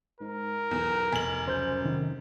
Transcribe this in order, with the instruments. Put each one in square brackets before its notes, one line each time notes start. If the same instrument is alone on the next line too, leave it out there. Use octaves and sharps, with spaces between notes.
[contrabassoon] G#2 [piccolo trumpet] A#4
[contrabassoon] B1 [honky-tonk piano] E2
[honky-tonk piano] F1 F#7 [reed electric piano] G#5
[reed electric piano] C#2 C5 G6 [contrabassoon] F#2
[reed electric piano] C3 D#3